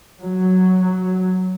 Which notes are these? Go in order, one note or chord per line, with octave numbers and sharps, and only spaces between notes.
F#3